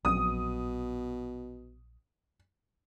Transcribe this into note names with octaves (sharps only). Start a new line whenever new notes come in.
A#1 B2 F#3 C4 D#6